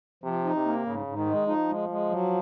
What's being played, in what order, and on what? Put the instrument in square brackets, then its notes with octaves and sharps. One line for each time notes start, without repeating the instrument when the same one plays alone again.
[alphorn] C3 [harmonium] F3
[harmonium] D#4
[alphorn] C3
[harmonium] A#3
[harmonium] G#2 [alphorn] C#3
[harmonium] G#2
[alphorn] D#3
[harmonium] G#3
[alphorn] F3 [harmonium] D#4
[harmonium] G#3
G#3
F#3